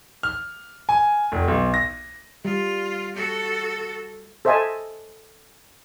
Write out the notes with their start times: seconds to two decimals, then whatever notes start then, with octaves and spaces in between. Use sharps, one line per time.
0.23 F6
0.89 G#5
1.32 F1
1.48 B1
1.74 A#6
2.45 G3 F4
3.16 F#4 A4
4.45 A4 C5 D#5 E5 G#5 A5